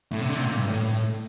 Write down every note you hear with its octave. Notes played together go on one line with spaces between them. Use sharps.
A2
C3
D3
C3
A#2
G2
A2